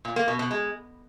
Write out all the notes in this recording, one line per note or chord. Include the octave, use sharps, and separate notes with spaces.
A#2
A#3
B2
B2
G#3